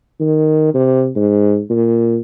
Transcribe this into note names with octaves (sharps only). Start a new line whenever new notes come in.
D#3
C3
G#2
A#2